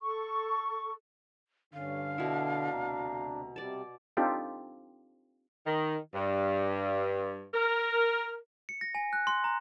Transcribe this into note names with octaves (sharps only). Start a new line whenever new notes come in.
A4 C#6
G2 D3 C#4 F5
B2 D4 E4
D2 C3 A#5
C3 G3 D5 A5
C4 D4 D#4 F4 G4 A4
D#3
G2
A#4
C#7
A#6
G#5
F#6
C6
A#5